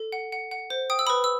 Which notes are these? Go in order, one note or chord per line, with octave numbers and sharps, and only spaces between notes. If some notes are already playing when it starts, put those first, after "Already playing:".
Already playing: A4
F#5
F#5
F#5
C5
G5 D#6
E6
B4 B5 D#6
E6